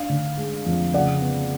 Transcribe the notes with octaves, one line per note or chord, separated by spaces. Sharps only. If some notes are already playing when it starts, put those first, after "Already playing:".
Already playing: D4 F5
D3
G#3
F2
C#3 D5 F#5
B3